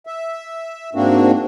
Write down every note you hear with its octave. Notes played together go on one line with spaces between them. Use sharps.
E5
G#2 A#3 C4 D4 F#4